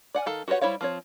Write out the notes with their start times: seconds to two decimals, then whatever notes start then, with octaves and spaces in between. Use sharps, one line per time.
0.15 D5 F#5 G#5
0.26 D#3 A4 F5
0.48 F#4 G4 B4 C#5 F#5
0.61 G3 E4 C5 C#5 F5
0.81 F3 C4 C#5